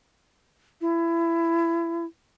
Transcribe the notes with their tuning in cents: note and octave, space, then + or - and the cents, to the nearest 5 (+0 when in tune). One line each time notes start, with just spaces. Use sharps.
E4 +25